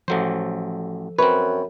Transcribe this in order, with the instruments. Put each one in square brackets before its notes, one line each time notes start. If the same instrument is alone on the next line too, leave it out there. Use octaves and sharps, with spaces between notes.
[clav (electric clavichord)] A1 F#3 C5 [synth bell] F3 A4
[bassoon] F#2 [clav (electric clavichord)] C4 C#5 [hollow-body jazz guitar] B4